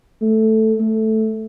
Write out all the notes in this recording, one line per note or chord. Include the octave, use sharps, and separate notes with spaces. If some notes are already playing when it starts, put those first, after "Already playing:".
A3
A3